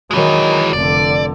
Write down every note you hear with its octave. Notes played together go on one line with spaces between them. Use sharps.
D#3 E3 F#3 G#3
F1 D3 D5